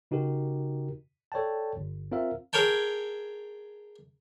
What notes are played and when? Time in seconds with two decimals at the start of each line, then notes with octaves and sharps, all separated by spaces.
0.11 C#3 D#4 F#4 G4 A#4
1.32 A4 C#5 D5 G5 A5
1.77 G1
2.12 C4 F4 A#4 E5 F5
2.53 G#4 A#4 C#5 G5 A5